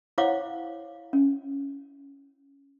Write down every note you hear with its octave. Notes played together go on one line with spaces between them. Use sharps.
E4 C5 C#5 F5 F#5 D6
C#4